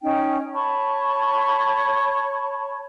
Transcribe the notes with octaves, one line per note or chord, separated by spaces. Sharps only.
C#4 D#4 G5
C#5 A5 B5 C#6